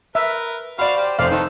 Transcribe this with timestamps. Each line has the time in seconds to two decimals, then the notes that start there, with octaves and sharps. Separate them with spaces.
0.15 A#4 B4 E5
0.79 F#4 C5 D5 F5 B5
0.96 G4 C5
1.19 F1 B3 C5 D5 F5
1.31 D#3 D#4 A4 B4